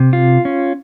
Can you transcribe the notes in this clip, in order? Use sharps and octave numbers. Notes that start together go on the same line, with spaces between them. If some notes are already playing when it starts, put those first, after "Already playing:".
Already playing: C3
F4
C#4